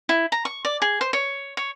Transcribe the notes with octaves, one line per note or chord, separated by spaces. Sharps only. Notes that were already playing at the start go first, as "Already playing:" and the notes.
E4
A#5
C#6
D5
G#4
C5
C#5
C#5